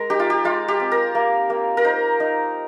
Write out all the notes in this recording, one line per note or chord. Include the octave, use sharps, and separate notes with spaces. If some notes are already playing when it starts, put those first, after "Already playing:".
Already playing: G#3 A#4
D#4 G4
F4
G4
G#3 F4
G4
C4
A#4
A#3
A#3
A#4
D#4 C5
D#4